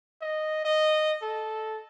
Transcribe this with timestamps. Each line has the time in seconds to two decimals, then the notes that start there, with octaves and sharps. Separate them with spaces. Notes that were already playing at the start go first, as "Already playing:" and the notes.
0.22 D#5
0.65 D#5
1.23 A4